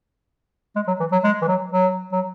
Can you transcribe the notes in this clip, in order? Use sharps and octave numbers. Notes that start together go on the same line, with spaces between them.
G#3
F#3
E3
F#3
G#3
E3
F#3
F#3
F#3